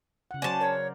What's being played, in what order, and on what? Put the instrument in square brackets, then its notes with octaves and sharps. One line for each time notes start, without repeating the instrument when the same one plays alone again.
[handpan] C#3 F#5
[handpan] F#3 C5 D5 [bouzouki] C#4 A5
[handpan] A#4 [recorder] C#5